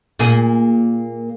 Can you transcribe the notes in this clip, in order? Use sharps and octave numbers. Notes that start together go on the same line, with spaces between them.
A#2 A#3 G#4